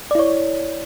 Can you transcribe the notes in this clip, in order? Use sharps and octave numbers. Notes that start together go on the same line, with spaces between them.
E4 C#5 D5